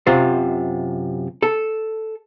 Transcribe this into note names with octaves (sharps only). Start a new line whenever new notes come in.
F#2 C3 F4 C5
A4